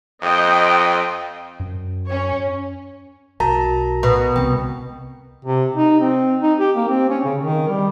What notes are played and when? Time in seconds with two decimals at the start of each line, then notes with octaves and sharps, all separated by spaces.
0.22 F2 D#5 G5 C6
1.60 F#2
2.07 C#4 C#5
3.40 B1 F#4 A#4 A5 A#5
4.03 B2
4.36 C2 C4 G5
5.45 C3
5.76 D#4
6.01 C4
6.42 D#4
6.59 G4
6.76 A#3
6.89 C4
7.10 C#4
7.25 C#3
7.40 D#3
7.68 G3